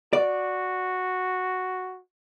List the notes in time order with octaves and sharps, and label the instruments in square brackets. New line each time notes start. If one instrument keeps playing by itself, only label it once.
[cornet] F#4 [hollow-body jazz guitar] D5